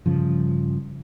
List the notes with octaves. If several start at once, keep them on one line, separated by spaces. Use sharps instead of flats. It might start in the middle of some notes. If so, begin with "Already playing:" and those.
G2 C#3 F3